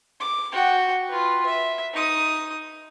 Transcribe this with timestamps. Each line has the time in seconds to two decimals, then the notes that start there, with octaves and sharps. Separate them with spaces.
0.21 D6
0.52 F#4 G5
1.09 F4 B4
1.46 E5
1.93 D#4 D#6